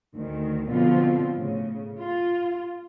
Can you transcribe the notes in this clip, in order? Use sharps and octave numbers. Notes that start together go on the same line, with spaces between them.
D2 D#3
B2 D3 F3 B3 C4 F4
A2 C#3
F4